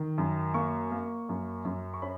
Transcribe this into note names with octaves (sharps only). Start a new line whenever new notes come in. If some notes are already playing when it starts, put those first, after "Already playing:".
Already playing: D#3
F#2
A#3 C#6
A#3
F#2
F#2
C#6
C#4 B5